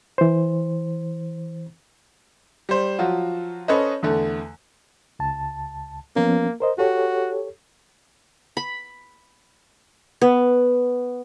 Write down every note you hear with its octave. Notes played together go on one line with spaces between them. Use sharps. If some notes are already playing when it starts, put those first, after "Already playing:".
E3 C5
G3 C5
F3 F#3 F4 F#4
C#4 A4 B4 C5 D#5
E2 D3 A3
C#2 A5
F3 A#3 B3 C#4
A#4 C5 D#5
F#4 G4 A4 C#5
B5
B3